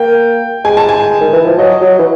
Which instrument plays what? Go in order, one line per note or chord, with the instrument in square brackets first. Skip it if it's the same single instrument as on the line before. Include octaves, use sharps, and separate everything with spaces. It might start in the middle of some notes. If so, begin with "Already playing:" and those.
Already playing: [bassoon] A#3 [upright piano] G5
[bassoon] G#3 [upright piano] G#5
[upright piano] A5
G#5
[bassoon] D#3
E3
F3
[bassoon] F#3 [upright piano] D#5
[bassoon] F#3
E3